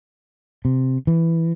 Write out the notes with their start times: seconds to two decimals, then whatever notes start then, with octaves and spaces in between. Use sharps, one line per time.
0.65 C3
1.07 E3